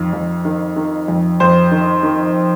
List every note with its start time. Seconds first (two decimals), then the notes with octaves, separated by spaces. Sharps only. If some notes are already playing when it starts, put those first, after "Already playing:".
Already playing: F2 D#3
0.13 F2
0.45 D#3
0.76 D#3
1.08 F2
1.40 F2 C5
1.72 D#3
2.03 D#3